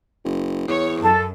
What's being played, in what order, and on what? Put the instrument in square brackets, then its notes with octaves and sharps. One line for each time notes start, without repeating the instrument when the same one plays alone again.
[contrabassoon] F#1
[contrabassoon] E2 [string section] C#5
[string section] F#2 [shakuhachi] A4 [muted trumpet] A5